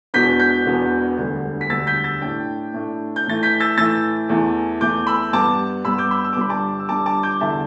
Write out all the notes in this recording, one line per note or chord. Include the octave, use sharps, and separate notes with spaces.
E1 E2 B2 B3 D4 G6 B6
G6 B6
E1 E2 B2 B3 D4
E1 D2 D3 G3
B6
E1 D2 D3 G3 E6 A6
G6 B6
E6 A6
A2 A3 D4 G5
A2 A3 D4
G6
A2 E3 A3 A6
G6 B6
E6 A6
A2 E3 A3 E6 A6
E2 E3 A3
E2 E3 A3 D6 G6
B5 E6
G2 G3 B3 A5 D6
G2 G3 B3 B5 E6
D6 G6
B5 E6
E6
D6
G1 G2 G3 D4 B5
A5 D6
E6
G1 G2 G3 D4 A5 D6
A5 D6
D6 G6
E2 D3 G3 E5 A5